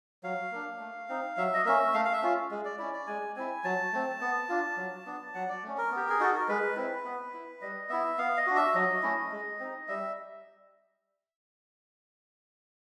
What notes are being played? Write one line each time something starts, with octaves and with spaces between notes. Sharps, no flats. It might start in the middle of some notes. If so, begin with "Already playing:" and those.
F#3 F5
A#3 D4
A3
C4 D#4
F#3 E5
D#5
A#3 C#4 E5
A3 F5
F5
E5
C#4 F4
G#3
D5
C#4 E4 D5
D5
G#3 G#5
C4 E4 G#5
F#3 A5
A3 C4
B3
D4 F4
F#3
B3 D4
F#3 F#5
D5
A3 C#4
A#4
B3 G4
G#4
D#4 F#4 A4
A#4
G#3 B4
C4 E4
B3
E4
G3 D#5
B3 E4 E5
B3 F5
D#5
D4 F#4
E5
F#3 D#5
A3 C#4 E4
G#3
C4 D#4
G3 E5